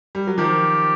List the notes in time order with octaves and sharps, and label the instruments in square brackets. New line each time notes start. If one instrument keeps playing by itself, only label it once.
[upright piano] G3
F#3
[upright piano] D#3 F3 [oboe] G4